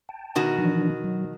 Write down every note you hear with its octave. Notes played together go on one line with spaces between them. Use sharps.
G5 A5
B2 D#3 F#4
E3 F3 D4
F#3